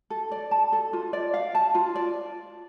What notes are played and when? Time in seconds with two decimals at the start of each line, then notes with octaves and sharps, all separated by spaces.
0.10 A4
0.32 D5
0.51 A5
0.72 A4
0.93 F4
1.13 D5
1.34 F5
1.55 A5
1.75 F4
1.95 D5